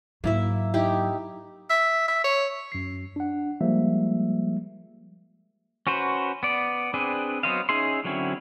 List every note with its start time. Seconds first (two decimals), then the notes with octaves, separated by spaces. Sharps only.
0.24 G#2 F#3 A#3 E4 E5
0.74 D#4 E4 G4
1.70 E5
2.08 E5
2.24 C#5
2.72 F#2 C7
3.16 D4 F#5
3.61 F3 G3 G#3 A#3 E5
5.87 C#4 F#4 B4 C5
6.43 B3 D5
6.94 C4 D4 G#4 B4
7.43 F#3 B3 C5 D#5 F5
7.69 C#4 D#4 G#4 E5 C6
8.05 D3 F#3 C4 C#4 E4